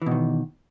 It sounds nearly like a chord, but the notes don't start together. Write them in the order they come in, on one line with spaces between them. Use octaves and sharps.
E3 B2 D#3